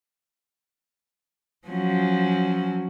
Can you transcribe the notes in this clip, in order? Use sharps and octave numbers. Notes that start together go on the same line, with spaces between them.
F3 F#3 C#4